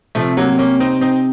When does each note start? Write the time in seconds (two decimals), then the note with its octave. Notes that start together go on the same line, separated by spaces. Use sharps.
0.15 C3 F3 A3
0.37 F#3 A#3
0.59 A#3 C#4
0.80 C4 D#4
1.01 C4 D#4